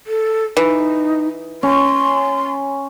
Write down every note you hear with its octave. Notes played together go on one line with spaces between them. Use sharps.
A4
E3 D#4
C#4 C6